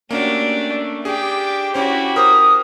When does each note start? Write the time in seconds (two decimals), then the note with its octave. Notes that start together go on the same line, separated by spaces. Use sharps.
0.11 A3 A#3 C#4 D4 F#4 G4
1.05 D4 G4 G#4 G5
1.74 C#4 E4 F#4 C5
2.16 A#4 C5 D6 D#6